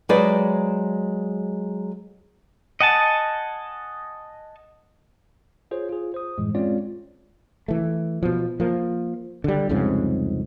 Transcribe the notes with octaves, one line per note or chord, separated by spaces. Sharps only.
F#3 G#3 G#4 B4 C5 D5
D#5 F#5 G#5 A5
F4 G#4 C5 C#5
F4 G#4
C5 D#6
F#2 A2 E3 G#3
G#3 C4 C#4 F4 C#5 D5
E3 A3
B2 F3
F3 A#3
D3 G3
C2 F2 G#2 C#3